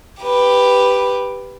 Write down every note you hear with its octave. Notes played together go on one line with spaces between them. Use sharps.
G4 B4